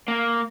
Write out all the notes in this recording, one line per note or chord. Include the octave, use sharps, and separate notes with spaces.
A#3